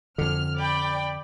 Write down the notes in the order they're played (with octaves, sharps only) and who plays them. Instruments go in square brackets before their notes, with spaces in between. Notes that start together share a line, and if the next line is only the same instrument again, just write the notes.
[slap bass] F2 D3 [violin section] F6
[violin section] D5 G5 B5